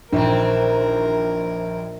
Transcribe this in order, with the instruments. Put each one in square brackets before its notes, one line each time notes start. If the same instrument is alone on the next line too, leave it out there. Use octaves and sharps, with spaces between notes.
[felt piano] A#1 [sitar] D#3 E3 C4 [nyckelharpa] A#4